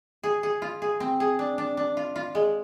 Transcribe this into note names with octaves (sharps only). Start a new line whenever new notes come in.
G#4
G#4
F4
G#4
C4
G#4
D4
D4
D4
F4
F4
G#3